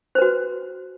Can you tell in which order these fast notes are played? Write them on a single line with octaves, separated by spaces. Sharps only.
C5 B4 F#4